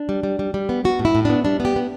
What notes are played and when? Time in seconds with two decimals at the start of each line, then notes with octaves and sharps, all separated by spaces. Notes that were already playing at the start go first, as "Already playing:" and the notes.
Already playing: D4
0.09 G3
0.23 G3
0.39 G3
0.54 G3
0.69 B3
0.85 B3 F#4
0.99 A2
1.05 E4
1.15 A2
1.25 B3 D4
1.45 G3 D4
1.60 B3
1.65 G4
1.76 B3